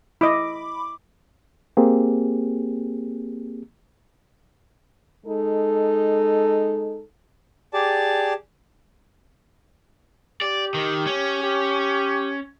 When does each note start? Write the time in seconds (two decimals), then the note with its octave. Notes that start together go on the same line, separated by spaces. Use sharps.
0.21 E4 D#5 B5 D6
1.77 A#3 C4 G4 G#4
5.26 G#3 D#4 A4
7.72 G4 G#4 D5 A5
10.42 G4 D5
10.74 D#3
11.07 C#4
11.43 G4